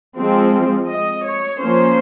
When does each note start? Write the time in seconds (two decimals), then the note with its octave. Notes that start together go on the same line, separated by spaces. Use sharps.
0.17 F3 G#3 C4
0.88 D#5
1.24 C#5
1.60 F3 A#3 C#4 C5